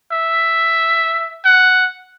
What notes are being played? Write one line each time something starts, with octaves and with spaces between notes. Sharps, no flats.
E5
F#5